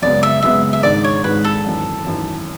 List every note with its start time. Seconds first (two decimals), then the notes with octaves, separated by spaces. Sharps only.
0.02 F#2 C#3 G#3 B3 D5
0.23 E5
0.42 F#2 C#3 G#3 B3 E5
0.73 E5
0.83 G#1 G#2 G#3 D4 D5
1.04 C#5
1.24 G#1 G#2 G#3 D4 B4
1.44 A4
1.64 G#1 F#2 E3
2.05 G#1 F#2 E3